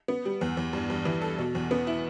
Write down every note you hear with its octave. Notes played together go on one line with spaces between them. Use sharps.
B3
G3
E2
E2
G2
G2
E3
A4
B2
E2
B3
E4